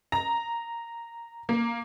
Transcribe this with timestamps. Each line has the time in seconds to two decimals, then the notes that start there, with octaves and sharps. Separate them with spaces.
0.12 A#5
1.49 A#3